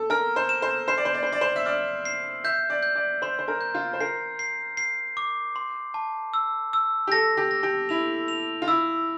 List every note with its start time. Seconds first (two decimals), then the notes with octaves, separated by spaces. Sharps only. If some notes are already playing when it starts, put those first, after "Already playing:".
Already playing: A4
0.10 A#4 F6
0.36 C5
0.49 E7
0.62 C5
0.88 C5 C7
0.98 D5
1.05 C5
1.15 D5
1.23 C5
1.27 C7
1.32 D5
1.41 C5
1.56 E5
1.66 D5 F6
2.05 C7
2.44 E5 G6
2.70 D5
2.83 G6
2.95 D5
3.22 C5 C6
3.39 C5
3.48 A#4
3.61 G6
3.75 F4
3.93 C5
4.00 A#4 C7
4.39 C7
4.77 C7
5.17 D6
5.56 C6
5.94 A5
6.34 E6
6.73 E6
7.07 G4
7.12 A4 A#6
7.37 G4
7.51 A#6
7.63 G4
7.89 E4 F7
8.28 F7
8.62 F4
8.68 E4 E6